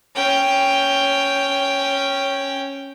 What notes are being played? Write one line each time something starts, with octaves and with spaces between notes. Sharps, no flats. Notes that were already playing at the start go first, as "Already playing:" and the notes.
C#4 G5